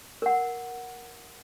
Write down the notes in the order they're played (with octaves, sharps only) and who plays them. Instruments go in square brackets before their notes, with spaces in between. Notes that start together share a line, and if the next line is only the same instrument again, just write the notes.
[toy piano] A#4 F#5